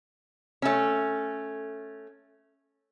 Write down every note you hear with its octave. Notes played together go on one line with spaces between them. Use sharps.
A3 C#4